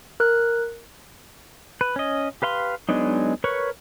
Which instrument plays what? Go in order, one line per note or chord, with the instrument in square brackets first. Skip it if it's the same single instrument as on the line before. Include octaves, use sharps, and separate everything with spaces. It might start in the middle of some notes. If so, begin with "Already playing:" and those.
[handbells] A#4 F#6
[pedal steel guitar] B4
C#4 D#5
G4 B4 F5 C6
F#3 G#3 B3 D4 D#4
A#4 B4 C#5 C#6